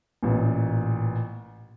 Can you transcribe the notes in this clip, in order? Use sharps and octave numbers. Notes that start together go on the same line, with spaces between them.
A1 A#2